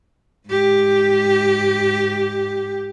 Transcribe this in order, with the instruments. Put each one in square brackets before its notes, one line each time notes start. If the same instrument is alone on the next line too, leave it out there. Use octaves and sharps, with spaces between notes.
[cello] G#2 G4